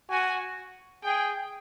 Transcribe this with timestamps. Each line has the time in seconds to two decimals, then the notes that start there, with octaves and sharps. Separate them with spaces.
0.10 F#4 G#5
1.04 G#4 G5